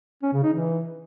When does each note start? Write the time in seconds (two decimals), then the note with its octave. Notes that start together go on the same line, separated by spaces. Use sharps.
0.23 C#4
0.33 C#3
0.43 D#4
0.53 E3